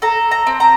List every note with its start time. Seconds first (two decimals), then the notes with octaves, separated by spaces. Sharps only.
0.02 A4 A#5
0.31 A#5
0.47 C4
0.60 A#5